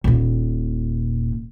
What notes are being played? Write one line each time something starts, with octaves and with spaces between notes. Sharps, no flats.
D#1 A#2